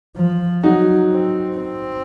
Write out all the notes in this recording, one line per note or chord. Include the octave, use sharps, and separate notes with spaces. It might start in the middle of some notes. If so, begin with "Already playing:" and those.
F3
F#3 D#4 F#4
C4
C4